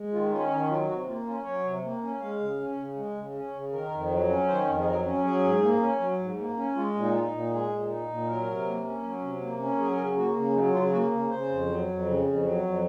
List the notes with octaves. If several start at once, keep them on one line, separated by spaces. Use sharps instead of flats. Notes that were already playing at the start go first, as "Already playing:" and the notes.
Already playing: G#3
D#3 F4
C#4 F4
D#3 D#4
F#3 F4
C3 F#4
A#3 F4
C#4 F4
F#3 C#5
C3
A#3
C#4
G#3 F5
C#3
C#4
C#3
G#3
C#3
C#4
C#3
D#3 A#4
F2
F#3
C#4
D#3 C5
F2
G#4
F#3 A#4
C#4
F#3 G#4
G#2
A#3
C#4
F#3
G#2
A#3
C#4
G#3 F4
A#2
D#4
D#4 F4
A#2
G#3 G#4
A#2
D#4
A#2
F#3 A#4
C3
A#3
C#4
F#3
C3
A#3
C#4
F#3 G#4
A#4
C#3
G#4
A#3 F#4
C#3
F#3 D#4
C#3 F4
A#3 F#4
C#3
C#3 C5
F2
F#3
F2
C#3
F2
F#3
F2